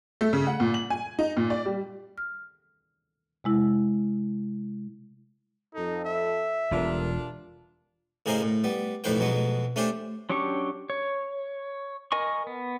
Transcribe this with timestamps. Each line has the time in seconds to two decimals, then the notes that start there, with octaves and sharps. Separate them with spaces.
0.21 A3
0.33 C#3
0.47 F#5
0.60 A#2
0.74 F#7
0.90 G#5
1.19 D#4
1.37 A#2
1.50 D5
1.65 G3
2.18 F6
3.44 C3 G#3 E4
5.75 F2 D#4 A4
6.05 E5
6.71 E1 B2 G3 D4 F4 A4 A#4
8.26 A2 C#3 G#4 A#4 C5 D#5
8.42 A2
8.64 G3 B3
9.04 B1 F2 A2 B4 C5 G5
9.19 F2 B2 F#3 G#3 B3
9.76 A3 C#4 D4 G4 C5
10.30 F#3 C#4 D4 G4 C#6
10.90 C#5
12.12 A#4 D#5 G#5 C#6
12.47 B3